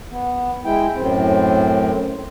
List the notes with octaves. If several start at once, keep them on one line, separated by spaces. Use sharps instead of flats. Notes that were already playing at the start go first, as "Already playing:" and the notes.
B3
G#3 E4 G5
F#2 A2 C4